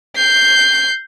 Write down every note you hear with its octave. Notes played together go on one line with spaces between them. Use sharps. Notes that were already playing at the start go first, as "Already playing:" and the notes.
G6 C7